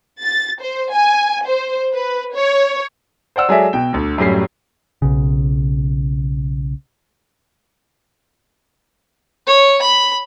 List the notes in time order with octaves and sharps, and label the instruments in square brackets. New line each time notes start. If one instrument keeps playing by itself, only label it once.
[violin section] A6
C5
G#5
C5
B4
C#5
[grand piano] C5 D5 F#5 E6
F#3 G#3 G#4 A4 D5 E5
B2 G5
D2 D3
F#2 A2 F#3 G3 C7
[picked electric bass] B1 C#3
[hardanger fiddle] C#5
B5